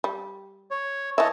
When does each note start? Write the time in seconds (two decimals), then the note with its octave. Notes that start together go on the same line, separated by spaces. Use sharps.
0.04 G3
0.71 C#5
1.18 E3 C#5 D#5 E5 A5